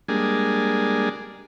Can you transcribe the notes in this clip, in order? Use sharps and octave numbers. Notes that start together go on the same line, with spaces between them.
G3 G#3 A#3 D4 G#4